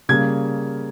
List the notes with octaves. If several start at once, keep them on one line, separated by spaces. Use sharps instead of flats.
C#3 G3 A#3 G#6